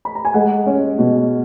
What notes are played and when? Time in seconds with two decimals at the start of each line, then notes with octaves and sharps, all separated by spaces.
0.05 B5
0.15 A#5
0.25 G#5
0.34 G#3 F#5
0.66 C#4
0.99 B2